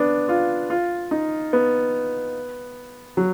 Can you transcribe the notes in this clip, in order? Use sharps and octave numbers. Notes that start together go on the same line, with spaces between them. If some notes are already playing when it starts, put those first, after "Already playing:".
Already playing: B3 D4
F4
F4
D#4
B3
F#3